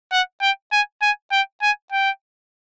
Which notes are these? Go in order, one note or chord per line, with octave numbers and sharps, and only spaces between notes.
F#5
G5
G#5
G#5
G5
G#5
G5